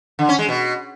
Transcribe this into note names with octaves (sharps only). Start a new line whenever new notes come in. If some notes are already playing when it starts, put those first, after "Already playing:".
D3
C#4
G#3
B2